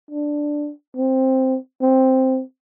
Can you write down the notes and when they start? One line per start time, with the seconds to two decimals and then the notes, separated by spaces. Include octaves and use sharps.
0.11 D4
0.96 C4
1.81 C4